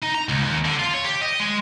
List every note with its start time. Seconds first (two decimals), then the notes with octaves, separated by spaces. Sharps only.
0.03 D#4
0.15 A#5
0.29 C#2
0.43 D#2
0.65 D3
0.79 F4
0.93 C#5
1.05 G4
1.21 D#5
1.40 G#3